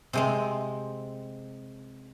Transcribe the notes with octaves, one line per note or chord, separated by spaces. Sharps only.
C3 G#3 C4